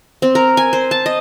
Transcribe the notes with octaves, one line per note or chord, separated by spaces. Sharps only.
C4
A#4
G#5
C5
A5
D#5